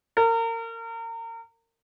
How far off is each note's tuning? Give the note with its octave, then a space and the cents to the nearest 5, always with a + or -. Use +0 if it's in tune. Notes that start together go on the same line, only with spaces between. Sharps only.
A#4 -30